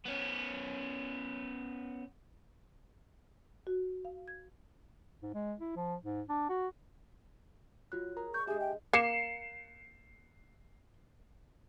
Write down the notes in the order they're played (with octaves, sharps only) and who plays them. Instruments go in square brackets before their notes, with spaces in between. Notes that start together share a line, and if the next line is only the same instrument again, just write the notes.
[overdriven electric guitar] B3 C#4
[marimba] F#4
F5
G#6
[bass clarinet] G#2
G#3
E4
F3
G#2
D4
F#4
[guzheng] F#3 [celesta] F4 F#4 F#6
[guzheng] G#4 [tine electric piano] A#4 A#5
[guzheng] D5 [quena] C#6 [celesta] G6
[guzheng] G#3 D4 [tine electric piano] G4 E5 G#5 [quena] G#4
[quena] G5
[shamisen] A#3 [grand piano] C7 C#7 E7